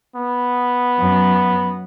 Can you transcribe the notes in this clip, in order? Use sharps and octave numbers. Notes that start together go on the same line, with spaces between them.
B3
F#2 F#3